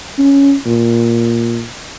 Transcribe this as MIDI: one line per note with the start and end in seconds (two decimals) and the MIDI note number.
0.18 0.55 61
0.66 1.66 46